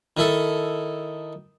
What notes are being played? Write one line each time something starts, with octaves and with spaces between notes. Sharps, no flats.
D#3 E4 A4